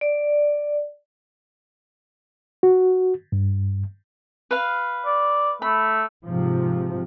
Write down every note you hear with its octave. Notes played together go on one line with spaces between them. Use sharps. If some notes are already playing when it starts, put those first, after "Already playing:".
D5
F#4
G2
B4 F5
D5
A3 B5
G#2 C3 F3